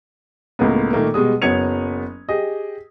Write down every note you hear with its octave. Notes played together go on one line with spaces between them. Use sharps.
C#2 A2 A#3 B3
A#2 D#3 A3 A#3
B2 G3 G#3 D#6
F#1 F#3 B3 G#6 C#7 F7
G4 G#4 D#5